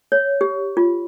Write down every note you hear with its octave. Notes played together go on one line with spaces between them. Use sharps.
C#5
G4
F4